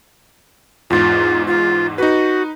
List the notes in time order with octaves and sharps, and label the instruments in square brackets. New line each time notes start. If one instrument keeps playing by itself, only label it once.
[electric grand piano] E2 G#2 [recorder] F4
[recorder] F4
[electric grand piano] D#4 B4 [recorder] F#4